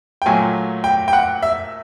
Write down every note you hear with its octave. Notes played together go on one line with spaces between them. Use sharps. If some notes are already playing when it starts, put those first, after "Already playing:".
G5
A#2 F#3 A3 G#5
G5
G5
F#5
E5